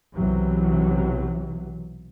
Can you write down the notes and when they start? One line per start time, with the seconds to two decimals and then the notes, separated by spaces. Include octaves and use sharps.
0.17 B1 C3 E3 F#3